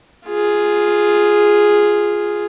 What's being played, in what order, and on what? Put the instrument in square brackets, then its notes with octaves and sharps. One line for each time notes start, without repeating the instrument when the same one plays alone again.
[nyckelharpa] F4 G#4